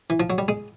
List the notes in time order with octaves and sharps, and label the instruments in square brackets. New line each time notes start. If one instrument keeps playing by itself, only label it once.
[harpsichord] E3
F3
F#3
G3
G#3